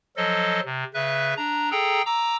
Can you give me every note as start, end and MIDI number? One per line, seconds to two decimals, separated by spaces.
0.17 0.60 53
0.17 0.60 54
0.17 0.60 69
0.17 0.60 75
0.65 0.84 48
0.94 1.34 49
0.94 1.34 71
0.94 1.34 76
0.94 1.34 90
1.37 1.71 62
1.37 1.71 82
1.71 2.02 68
1.71 2.02 69
1.71 2.02 79
1.71 2.02 82
2.06 2.37 82
2.06 2.37 86
2.06 2.37 88